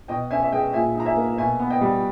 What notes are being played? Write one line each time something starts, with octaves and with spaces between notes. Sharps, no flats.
B2 D#5 G5
C#4 E5 G#5
E5
G#3 D#5 G5
A#2 E5 G#5
D#4
A#5
E5 G#5
A#3
B2 E5 G#5
B3
D#5 G5
G3